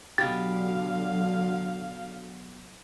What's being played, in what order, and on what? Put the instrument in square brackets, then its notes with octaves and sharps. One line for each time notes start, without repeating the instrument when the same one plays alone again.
[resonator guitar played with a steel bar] B2 G4 [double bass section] D3 F#3 [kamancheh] F5 [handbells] A6